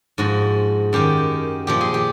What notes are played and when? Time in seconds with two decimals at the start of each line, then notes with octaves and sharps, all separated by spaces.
0.18 G#2 F3 F#4
0.93 F#2 D#3 G4
1.67 A#2 F3 G4
1.81 G#4
1.94 G4